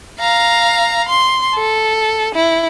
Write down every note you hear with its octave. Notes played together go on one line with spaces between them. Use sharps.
F5 A#5
C6
A4
E4